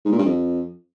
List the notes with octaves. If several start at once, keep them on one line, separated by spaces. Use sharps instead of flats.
G#2
A#2
G2
F2